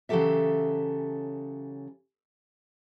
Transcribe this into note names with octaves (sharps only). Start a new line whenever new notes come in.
C#3 E3 F#3 G4 A4 E5